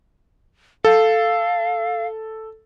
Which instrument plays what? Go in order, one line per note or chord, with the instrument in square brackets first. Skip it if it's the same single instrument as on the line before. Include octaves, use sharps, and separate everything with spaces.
[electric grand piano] A4 [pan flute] F5